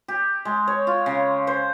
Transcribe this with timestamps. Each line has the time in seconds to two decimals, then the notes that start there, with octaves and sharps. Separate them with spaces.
0.08 G4
0.45 G#3
0.68 C#5
0.87 F4
1.06 C#3
1.47 C5